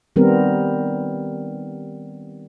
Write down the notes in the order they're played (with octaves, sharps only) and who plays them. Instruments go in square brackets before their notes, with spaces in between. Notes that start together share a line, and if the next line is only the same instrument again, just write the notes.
[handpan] D#3 G3 B3 C4 A#4